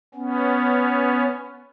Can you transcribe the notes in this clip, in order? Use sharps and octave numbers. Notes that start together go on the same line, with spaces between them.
B3 C#4